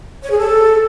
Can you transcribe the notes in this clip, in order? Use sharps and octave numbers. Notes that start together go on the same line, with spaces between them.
C#5
G#4
A4